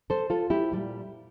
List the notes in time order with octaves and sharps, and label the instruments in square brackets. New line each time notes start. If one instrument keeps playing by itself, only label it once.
[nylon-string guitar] A4 C5
F4 A4
E4 G4
A#2 G3